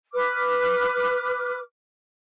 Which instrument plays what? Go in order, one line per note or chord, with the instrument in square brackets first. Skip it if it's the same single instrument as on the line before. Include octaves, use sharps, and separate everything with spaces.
[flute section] B4 D6 F6